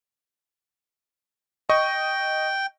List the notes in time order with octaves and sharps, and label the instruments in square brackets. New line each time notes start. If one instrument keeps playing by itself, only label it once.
[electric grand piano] D#5 C#6 [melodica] G5